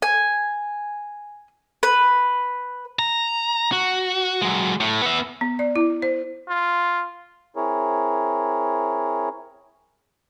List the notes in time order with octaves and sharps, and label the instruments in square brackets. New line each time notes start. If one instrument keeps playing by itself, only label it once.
[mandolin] G#5
B4
[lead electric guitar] A#5
F#4
F#3 G#3
A2
B3 E5
[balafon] B3
D5
E4
C5
[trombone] F4
[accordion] C4 E4 G#4 A#4 C#5